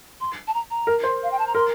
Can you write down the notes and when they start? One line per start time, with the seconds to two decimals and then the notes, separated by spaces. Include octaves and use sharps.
0.20 C6
0.47 A5
0.54 A#5
0.70 A#5
0.87 A#4
1.03 C5
1.23 F5
1.31 G5
1.39 A5
1.47 A#5
1.55 A#4 C6